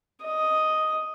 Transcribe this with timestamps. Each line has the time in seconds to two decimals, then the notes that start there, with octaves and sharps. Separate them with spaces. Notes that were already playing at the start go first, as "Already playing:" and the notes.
0.23 D#5